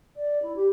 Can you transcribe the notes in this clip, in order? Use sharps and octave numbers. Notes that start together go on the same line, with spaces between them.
D5
E4
G4